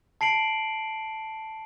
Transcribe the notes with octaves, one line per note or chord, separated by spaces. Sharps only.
A5 C7 D7 F#7